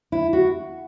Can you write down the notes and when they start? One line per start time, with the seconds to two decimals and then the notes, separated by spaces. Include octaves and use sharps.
0.12 E4
0.33 F#4